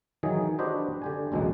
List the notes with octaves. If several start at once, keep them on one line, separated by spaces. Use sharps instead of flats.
D#3 E3 F#3 G#4
D4 F#4 G4 B4 C5 D#5
D3 G4 G#5
A1 D2 B2 F#3 G#3